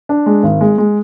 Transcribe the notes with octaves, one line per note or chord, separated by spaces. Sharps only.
D4
G#3
G#1
G#3
G#3